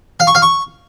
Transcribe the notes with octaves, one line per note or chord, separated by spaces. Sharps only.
F5
C#6
F5
C#6